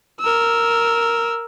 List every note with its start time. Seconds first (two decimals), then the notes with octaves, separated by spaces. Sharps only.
0.20 A#4 E6